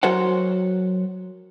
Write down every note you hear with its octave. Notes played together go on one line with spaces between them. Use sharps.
F#3 F#4 A#4 C5 C#5 F#5